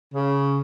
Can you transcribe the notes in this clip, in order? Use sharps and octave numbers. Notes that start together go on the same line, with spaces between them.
C#3